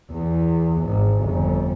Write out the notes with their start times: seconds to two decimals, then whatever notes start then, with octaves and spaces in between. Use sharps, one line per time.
0.11 E2
0.82 G#1
1.23 G1 F2